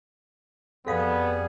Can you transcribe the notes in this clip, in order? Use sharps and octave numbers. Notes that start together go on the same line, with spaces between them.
F2 G3 B3 G#4 A4 F5 D#6